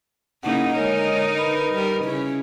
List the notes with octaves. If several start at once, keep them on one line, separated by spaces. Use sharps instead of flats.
C#3 A#3 D#4 E4 F#5
D3 G#3 A#4 C#5
B4 B5
G3 A#4
C#3 C#4 E4